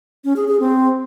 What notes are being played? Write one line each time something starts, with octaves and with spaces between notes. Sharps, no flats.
C#4
G#4
G#4
C4